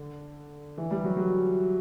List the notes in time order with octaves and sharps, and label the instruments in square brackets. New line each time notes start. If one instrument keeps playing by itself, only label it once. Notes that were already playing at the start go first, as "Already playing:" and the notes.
Already playing: [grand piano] D3
E3
G3
F#3
F#3